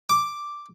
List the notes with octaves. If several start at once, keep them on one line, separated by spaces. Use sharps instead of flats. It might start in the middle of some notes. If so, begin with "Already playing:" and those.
D6